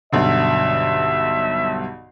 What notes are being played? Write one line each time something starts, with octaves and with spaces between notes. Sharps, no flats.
B1 G2 D3 E5